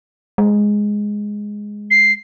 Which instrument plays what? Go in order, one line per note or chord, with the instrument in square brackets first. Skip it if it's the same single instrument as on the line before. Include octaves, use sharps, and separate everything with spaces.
[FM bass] G#3
[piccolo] C7